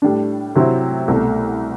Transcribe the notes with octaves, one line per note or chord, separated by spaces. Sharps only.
A2 G3 D4
C3 F#3 C4 E4
C2 B2 A3